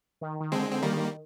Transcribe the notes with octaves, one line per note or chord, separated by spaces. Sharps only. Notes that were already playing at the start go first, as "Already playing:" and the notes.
D#3
D#3
D3 G#3 C4
D3 C4
D#3 G3 A#3